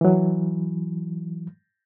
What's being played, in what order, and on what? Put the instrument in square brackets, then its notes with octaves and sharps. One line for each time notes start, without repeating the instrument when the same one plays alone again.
[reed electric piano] E3 F#3